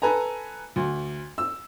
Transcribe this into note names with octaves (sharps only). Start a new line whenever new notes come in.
A4 B4 G#5 A#5
D2
E6